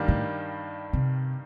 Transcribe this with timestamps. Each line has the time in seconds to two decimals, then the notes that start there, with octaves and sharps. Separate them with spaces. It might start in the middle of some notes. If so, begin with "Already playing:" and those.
Already playing: G2 D#3 G3 A#3
0.08 A2
0.93 C3